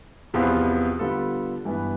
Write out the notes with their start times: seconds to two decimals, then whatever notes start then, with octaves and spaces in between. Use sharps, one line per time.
0.34 E2 C3 F3 B3 F4
0.99 D3 G3 B3 F4 A4
1.65 G2 E3 B3